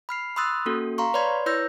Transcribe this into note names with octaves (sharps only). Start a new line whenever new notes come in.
B5 F6 C7
B5 C6 D#6 E6 F#6 A6
A#3 C#4 F#4 A4
F5 A#5 C6 C#6
B4 C#5 D5 B5 C6 G#6
E4 B4 C#5 E6 G6 A#6